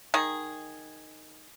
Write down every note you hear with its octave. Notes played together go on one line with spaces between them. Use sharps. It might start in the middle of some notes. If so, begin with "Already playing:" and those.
D#3 G#4